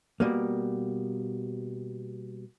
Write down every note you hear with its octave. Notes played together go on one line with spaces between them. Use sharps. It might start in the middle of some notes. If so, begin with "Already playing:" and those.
B2 G3 A#3